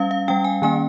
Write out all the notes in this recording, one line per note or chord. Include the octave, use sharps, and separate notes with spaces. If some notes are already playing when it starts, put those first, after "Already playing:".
Already playing: G3 C#4 F5
F5
G3 C#4 G5
G#5
D#3 A#3 C#4 G#5